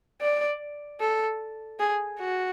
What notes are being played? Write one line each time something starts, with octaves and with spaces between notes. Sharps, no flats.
D5
A4
G#4
F#4